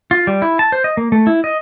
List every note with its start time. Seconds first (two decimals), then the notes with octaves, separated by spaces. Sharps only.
0.11 F4
0.27 G3
0.42 E4
0.59 A5
0.72 C5
0.84 D#5
0.97 A#3
1.12 A3
1.27 E4
1.44 D#5